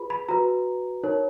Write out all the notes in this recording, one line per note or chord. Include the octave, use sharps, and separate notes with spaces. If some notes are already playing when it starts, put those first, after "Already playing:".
Already playing: F4 G#4 B4 B5
B5
F#4 B4 A#5
D#4 A#4 C#5